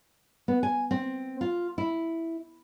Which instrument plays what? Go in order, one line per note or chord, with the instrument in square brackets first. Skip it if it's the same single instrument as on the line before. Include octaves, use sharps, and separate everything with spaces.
[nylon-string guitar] B3
G#5
C4
F4
E4